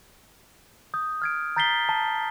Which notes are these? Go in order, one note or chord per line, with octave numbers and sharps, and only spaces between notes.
D#6 G6
F6 G#6 D7
A#5 G6 A6 B6 C7 G7
A5